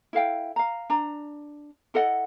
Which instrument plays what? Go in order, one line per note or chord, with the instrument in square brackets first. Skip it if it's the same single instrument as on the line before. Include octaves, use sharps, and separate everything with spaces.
[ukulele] E4 A4 F5 G5
F5 A#5
D4 A#5
E4 A4 D#5 F#5